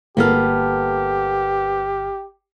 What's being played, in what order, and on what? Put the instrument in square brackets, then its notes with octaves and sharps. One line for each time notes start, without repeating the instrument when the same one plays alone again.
[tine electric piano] G1 F6 [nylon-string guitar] A#3 B3 A4 [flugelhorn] G4